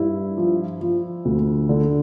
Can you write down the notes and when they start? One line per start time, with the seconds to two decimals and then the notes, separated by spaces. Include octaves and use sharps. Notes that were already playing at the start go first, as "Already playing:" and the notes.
Already playing: G2 E4
0.37 F3
0.81 F3
1.25 D2
1.69 D3